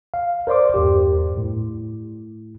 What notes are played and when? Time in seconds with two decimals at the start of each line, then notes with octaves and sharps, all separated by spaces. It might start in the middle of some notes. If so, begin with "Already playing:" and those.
0.14 F5
0.47 A#4 C5 D5 C6 D6
0.74 E2 G2 G4
1.37 A2